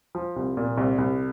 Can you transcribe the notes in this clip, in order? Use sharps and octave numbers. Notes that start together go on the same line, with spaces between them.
F3
C2
A#2
C2
C2